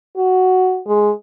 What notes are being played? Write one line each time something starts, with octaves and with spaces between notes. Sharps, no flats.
F#4
G#3